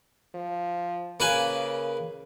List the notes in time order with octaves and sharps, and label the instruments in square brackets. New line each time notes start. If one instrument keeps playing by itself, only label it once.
[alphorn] F3
[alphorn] C#3 [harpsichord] A#3 B4 G#5